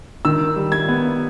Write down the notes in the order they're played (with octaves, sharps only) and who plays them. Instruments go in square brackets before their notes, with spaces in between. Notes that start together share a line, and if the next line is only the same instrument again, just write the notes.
[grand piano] D#3 E6
G3
G#6
B3